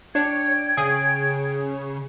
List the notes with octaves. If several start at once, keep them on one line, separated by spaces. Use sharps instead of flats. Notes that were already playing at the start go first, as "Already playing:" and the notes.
D4 C#5 G5 G#6
C#3 G#4